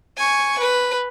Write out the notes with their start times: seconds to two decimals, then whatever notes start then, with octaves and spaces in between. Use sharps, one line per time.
0.17 G#5 C#6
0.59 B4